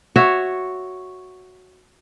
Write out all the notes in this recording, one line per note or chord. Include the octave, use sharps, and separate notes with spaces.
F#4 C#5 E5